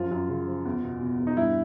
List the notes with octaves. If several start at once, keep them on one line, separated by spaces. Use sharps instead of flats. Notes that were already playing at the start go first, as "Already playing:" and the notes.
Already playing: F#2 F3 F4
F#2
C#3
F3
E2
B2
B2
E2
D#4
G2 E4